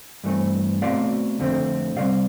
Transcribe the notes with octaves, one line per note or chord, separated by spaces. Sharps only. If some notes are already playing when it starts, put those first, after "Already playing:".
G2 E3 A3 C4
B2 A3 C4 D5 F5
F2 D3 A3 C4
C3 G3 C4 D5 F5